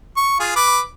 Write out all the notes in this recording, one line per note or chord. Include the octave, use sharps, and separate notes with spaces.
C#6
F4 G#4
B4 D6